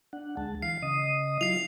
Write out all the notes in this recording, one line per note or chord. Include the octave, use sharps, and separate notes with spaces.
D4 F#5
D2 G#3 A5
E3 F5 C7
C#3 D#5 D#6
F#3 E4 F4 C7 F7